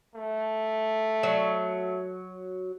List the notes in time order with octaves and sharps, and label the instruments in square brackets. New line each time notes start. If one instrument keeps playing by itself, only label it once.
[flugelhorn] A3
[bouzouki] F#3